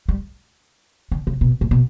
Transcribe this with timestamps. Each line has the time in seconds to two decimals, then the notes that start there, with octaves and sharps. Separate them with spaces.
0.08 G3
1.12 D3
1.27 C#3
1.41 B2
1.61 A2
1.71 B2